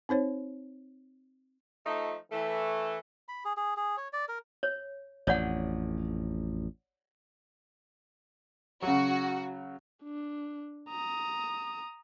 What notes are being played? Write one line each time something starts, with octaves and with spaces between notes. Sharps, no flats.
C4 D#4 C5 C#5
F3 A3 D#4
E3 A3
B5
G#4
G#4
G#4
C#5
D5
A#4
C#5
A1 F2 C#5 D5 F#5
C#3 F#3 F#4
D4
A#5 D#6